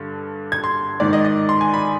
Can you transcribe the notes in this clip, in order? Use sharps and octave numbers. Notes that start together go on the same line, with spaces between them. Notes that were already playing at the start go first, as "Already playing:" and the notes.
Already playing: G2 D3
G#6
C6
G#2 D#3 D5
D#5
D#5
C6
G#5
B5